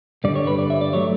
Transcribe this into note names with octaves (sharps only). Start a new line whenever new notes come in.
G2 D3 G3 D5
C#5
B4
D5
E5
D5
F#3 A3 C#5